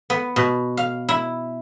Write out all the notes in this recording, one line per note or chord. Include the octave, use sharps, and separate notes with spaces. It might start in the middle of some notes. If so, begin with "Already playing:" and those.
B3
B2
F5
E4